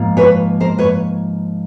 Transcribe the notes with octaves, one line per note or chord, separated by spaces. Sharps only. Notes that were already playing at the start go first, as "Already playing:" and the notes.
Already playing: G#2 F3 A#3
B4 C#5
A#4 C5
B4 C#5